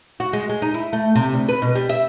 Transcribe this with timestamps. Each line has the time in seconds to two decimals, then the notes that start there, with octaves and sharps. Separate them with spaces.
0.20 F#4
0.33 G#3
0.49 G#3
0.62 D#4
0.74 E4
0.93 A3
1.15 C3
1.34 D2
1.49 B4
1.62 B2
1.75 G3
1.89 E5